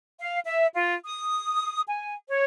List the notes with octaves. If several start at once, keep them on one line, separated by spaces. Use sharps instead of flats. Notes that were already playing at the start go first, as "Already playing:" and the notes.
F5
E5
F4
D#6
G#5
C#5